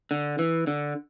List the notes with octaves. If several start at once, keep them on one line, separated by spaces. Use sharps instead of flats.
D3
E3
D3